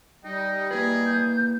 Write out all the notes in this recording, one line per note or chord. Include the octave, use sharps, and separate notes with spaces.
G3 D#4 D#5 G5
A#3 E4 G#4 B4
G6